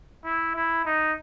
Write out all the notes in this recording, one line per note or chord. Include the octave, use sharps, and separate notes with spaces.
E4
E4
D#4